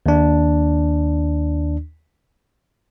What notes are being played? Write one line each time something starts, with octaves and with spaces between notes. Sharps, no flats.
D#2 D4